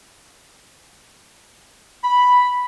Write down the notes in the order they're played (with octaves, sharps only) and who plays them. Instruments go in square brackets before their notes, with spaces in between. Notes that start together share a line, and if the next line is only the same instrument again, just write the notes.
[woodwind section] B5